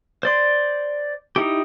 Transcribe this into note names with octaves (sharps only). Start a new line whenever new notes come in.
C5 D5 C6
D#4 E4 G4